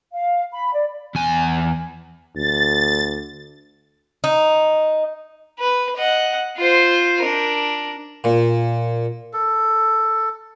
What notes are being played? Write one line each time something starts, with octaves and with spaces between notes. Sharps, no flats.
F5
B5
D5
E2 G#5
D2 A6
D#4
B4
D#5 F#5
F4 C5
D4 A#4
A#2
A4